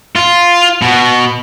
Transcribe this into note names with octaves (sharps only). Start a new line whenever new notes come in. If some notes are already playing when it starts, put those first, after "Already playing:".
F4
B2